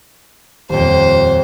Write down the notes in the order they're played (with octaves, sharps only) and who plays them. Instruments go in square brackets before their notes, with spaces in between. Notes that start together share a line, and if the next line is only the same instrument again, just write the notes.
[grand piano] D#1 F2 [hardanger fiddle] C5